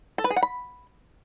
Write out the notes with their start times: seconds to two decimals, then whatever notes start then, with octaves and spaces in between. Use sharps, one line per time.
0.18 A4
0.24 B4
0.30 G#4
0.36 F#5
0.43 B5